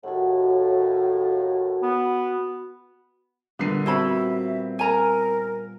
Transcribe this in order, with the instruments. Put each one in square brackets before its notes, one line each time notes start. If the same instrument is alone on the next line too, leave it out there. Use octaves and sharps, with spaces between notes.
[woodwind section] D#2 A2 [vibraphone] F#4 F#5
[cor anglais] B3
[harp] A#2 G3 B3 [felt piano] D3 C7 D#7
[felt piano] C4 [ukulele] E4 F#4 B5 [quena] E5
[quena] A#4 [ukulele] G#5 A#5